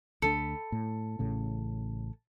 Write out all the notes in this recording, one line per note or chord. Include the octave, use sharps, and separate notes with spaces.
D2 A3 D4 A4 B5
A2
A1 A2 C#3